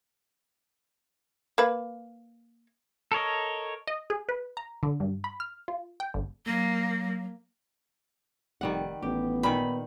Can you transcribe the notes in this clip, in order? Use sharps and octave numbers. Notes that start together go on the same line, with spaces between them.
A#3 B4
A4 A#4 C#5 D#5
D#5
G#4
B4
A#5
D3
G2
B5
F6
F4
G5
G1
F#3 A#3
F1 D#3 G3 F#5
A1 B3 G4
A#2 D#3 B5